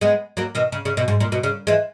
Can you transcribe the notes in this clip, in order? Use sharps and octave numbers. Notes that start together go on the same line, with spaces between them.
G#3 B3
F#3 A#3
B2 D#3
C#3
C#3
B2
G#2
A#2
B2
C#3
E3 G#3